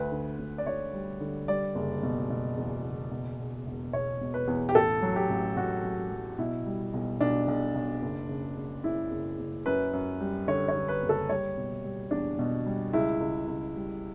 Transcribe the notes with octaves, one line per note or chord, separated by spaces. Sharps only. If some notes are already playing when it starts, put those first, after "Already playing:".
Already playing: D2 B4
D3
D2
D5
D2 C#5
G3
D3
G3 D5
F#1
B2
B2
E2
F#1
B2
E1
E1
E1 C#5
B2
B4
E2
G4
A1 A4
F#3
G4
A1
A1 F#4
F#3
F#3
B2 E4
G3
B1
B1 D4
B1
B1
F#1
C#3
C#3
C#3 E4
F#1
F#1
F#2 B4
F#2
G3
D3 C#5
C#5
D3
B4
F#1
A4
G3 C#5
B2
G3
E2 D4
B2
G3
C#2 E4
C#2
C#2
G3